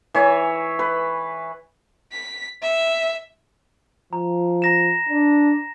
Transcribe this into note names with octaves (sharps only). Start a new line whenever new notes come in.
E3 C#5 E5
B4
B6
E5
F3 A#5
A#5 A#6 E7
D4